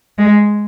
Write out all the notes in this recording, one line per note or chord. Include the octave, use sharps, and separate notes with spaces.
G#3